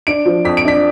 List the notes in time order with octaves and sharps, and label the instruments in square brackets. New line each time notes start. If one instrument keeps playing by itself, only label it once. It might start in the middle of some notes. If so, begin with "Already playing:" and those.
[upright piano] D4 D7
F3
F2 B6
D7
D4 B6